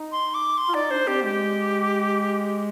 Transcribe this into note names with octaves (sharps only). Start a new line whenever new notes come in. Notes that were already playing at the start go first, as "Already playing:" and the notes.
Already playing: D#4
C6
D6
C6
F4
D#4 D5
D4 C5
C4 G4
G#3 G4